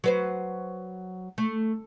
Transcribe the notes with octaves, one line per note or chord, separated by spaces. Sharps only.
F#3 B4 C5
A3